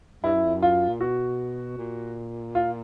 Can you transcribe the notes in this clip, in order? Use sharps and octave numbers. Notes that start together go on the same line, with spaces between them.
G2 E4
F#2
F2
F#2
F4
A#2
B2 F#4
A#2
F4